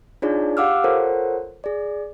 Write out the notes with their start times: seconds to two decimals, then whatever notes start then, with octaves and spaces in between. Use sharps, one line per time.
0.22 D4 D#4 F4 G#4 C#5 D5
0.57 G4 F5 F#5 D6 E6 F6
0.84 F4 A4 A#4 C5 C#5 F#5
1.64 G#4 D5